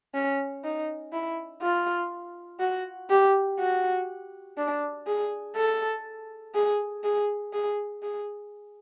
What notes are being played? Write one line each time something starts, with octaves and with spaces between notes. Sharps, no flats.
C#4
D#4
E4
F4
F#4
G4
F#4
D4
G#4
A4
G#4
G#4
G#4
G#4